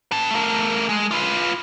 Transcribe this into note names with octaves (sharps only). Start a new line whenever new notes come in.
B4 A5
A3 A#4
G#3
F4 B4